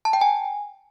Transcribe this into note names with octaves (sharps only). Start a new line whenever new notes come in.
A5
G5
G#5